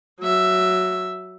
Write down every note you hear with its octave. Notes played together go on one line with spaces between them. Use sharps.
F#3 E5